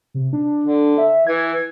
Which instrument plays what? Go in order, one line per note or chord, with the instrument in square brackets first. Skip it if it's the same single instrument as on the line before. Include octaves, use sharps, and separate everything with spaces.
[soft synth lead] C3
D4
[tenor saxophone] D3
[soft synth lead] E5
[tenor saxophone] E3 [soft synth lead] G#6